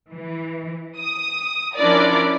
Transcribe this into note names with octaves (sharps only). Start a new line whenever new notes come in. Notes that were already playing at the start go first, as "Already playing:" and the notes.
E3
D#6
F3 C#4 D4 E4 A#4 D5